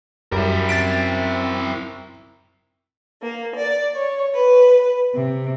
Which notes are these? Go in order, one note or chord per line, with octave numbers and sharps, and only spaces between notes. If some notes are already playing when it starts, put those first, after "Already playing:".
F#2 G3 E4 A#4
C4 A6 B6 D7
A#3
D5
C#5
B4
C3